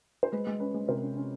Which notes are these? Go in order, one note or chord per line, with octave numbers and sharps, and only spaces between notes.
C5
G#3 B4
G#3
C#4 B4
G#3
C3 A#4 C5
C#4
C#4